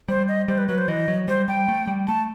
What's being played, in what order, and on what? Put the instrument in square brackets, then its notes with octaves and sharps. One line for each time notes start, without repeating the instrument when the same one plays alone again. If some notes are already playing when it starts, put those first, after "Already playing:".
[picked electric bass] G3 [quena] C5
[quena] D#5
[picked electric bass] G3 [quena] C5
[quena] B4
[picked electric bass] F#3 [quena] B4
[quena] C5
[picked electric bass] E3 [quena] D#5
[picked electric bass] F#3
[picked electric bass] G3 [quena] C5
[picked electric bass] G3 [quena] G5
[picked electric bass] A3
G3
[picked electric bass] A3 [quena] A5